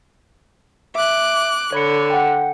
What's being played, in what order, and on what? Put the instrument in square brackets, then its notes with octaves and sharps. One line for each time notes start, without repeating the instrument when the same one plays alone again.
[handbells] E5 [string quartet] D6 F#6
[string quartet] D3 [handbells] C#5 B5 C#7
[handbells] F#5 G5